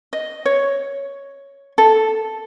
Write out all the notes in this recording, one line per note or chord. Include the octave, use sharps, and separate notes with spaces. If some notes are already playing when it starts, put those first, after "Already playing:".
D#5
C#5
A4